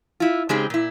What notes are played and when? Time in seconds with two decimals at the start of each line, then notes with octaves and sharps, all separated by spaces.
0.20 E4 F4
0.49 C#3 G#3 C4 D#4 G4 G#4
0.70 A#2 E4